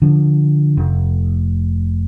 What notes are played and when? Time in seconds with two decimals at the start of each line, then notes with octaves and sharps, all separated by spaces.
0.02 D3 F3
0.77 F1